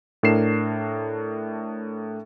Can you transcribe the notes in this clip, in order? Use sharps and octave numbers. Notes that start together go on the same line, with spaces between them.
A2 D4 A#4 C7 E7